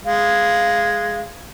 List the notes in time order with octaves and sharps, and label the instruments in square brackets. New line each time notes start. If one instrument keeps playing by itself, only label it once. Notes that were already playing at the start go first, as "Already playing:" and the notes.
[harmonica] G#3 [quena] F5